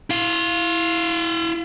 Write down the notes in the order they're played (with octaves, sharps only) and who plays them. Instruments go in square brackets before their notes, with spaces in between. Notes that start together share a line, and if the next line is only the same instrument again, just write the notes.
[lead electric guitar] E4 F5